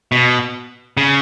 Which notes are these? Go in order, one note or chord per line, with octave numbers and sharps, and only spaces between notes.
B2
C#3